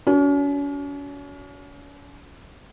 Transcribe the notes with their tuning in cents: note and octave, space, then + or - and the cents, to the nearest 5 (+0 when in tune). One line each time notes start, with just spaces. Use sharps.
C#4 +40 F#4 +0